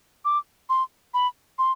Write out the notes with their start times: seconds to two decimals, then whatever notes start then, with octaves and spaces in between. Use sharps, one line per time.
0.25 D6
0.69 C6
1.14 B5
1.59 C6